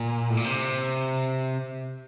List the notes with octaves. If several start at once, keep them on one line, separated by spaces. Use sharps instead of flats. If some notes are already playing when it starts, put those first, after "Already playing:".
Already playing: A#2
A2
A#2
C3